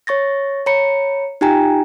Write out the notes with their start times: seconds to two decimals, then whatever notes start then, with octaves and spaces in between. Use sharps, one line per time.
0.07 C#5 C#6 A6 A#6
0.66 C#5 A#5 B5 C#7
1.41 D#4 F4 G4 G5 G#5 A#5